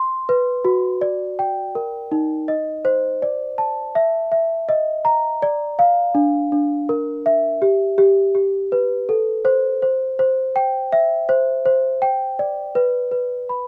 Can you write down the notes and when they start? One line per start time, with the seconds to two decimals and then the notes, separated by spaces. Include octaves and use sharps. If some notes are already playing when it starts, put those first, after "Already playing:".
Already playing: C6
0.29 B4
0.65 F#4
1.01 D5
1.39 G5
1.75 A#4
2.12 D#4
2.48 D#5
2.85 C5
3.22 D5
3.58 A5
3.95 E5
4.32 E5
4.69 D#5
5.05 A#5
5.42 D5
5.79 F5
6.15 D4
6.52 D4
6.89 A#4
7.26 E5
7.62 G4
7.98 G4
8.35 G4
8.72 B4
9.09 A4
9.45 C5
9.82 C5
10.19 C5
10.56 G5
10.92 E5
11.29 C5
11.65 C5
12.02 G5
12.39 D5
12.75 B4
13.12 B4
13.49 B5